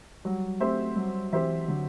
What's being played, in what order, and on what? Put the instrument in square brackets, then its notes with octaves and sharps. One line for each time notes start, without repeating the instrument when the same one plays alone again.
[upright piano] F#3 [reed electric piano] G3
[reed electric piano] A3 [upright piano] C4 G4 C5 E5
[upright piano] F#3 [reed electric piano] G3
[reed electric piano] E3 [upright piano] C4 G4 C5 E5
[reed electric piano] D3 [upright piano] F#3